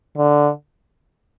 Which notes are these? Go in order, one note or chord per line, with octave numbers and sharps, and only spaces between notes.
D3